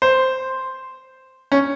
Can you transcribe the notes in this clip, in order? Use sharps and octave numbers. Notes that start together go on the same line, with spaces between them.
C5
C#4